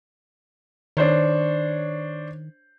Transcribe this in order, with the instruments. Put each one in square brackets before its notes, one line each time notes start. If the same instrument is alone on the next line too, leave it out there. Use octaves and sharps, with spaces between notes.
[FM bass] D#3 [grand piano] D4 C5 C#5